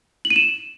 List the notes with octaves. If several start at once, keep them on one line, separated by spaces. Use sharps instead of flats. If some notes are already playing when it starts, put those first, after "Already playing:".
F#7
D#7
E7